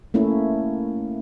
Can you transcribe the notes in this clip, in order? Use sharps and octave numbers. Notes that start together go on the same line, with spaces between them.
A3 A#3 C#4 E4